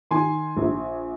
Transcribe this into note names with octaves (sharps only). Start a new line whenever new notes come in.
D#3 G#5 C6
A#1